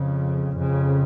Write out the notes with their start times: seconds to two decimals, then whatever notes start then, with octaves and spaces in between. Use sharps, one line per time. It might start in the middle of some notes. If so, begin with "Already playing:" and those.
Already playing: F2 C#3
0.57 F2 C#3